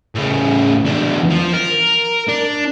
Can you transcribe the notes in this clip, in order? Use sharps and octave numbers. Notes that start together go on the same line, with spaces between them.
A2 C#3
E2 D4
F3
A#4
D4